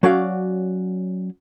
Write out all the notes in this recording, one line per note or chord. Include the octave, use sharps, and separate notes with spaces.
F#3 C#4 F#4 D5 F5